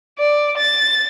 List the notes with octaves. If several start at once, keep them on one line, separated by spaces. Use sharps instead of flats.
D5
A6